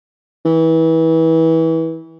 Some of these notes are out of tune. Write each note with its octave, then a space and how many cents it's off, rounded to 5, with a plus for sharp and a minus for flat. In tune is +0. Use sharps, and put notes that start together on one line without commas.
E3 -25